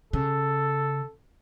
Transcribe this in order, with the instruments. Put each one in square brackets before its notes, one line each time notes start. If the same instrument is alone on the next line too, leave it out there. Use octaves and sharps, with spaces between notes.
[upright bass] C#3 [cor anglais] A4